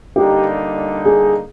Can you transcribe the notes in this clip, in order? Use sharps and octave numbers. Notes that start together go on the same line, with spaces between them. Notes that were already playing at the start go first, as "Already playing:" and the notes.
D3 G3 A#3 D#4 G4
G#4